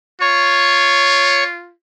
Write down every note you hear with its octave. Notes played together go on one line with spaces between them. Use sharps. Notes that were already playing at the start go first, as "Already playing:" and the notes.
F4 C#5 C#6